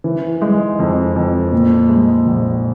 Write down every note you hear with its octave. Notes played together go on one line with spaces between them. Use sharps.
E3
G#3
F2
F2
A#2
G#3
A#1